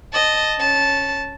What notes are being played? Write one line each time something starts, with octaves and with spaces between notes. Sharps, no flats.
D#5 A5
C#4 A5